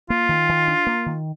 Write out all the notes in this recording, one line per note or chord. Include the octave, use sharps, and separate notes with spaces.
A#3 F4
D#3
D#3
D4
A#3
D#3